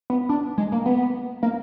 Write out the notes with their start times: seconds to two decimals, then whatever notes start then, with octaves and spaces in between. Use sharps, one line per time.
0.10 B3
0.29 D4
0.58 G#3
0.72 A#3
0.86 B3
1.43 A#3